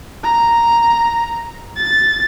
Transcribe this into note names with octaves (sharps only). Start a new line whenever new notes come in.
A#5
A6